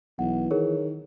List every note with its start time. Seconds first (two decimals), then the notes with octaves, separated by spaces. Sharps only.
0.19 B1 E3 F#5
0.51 D#3 G#4 A#4 C#5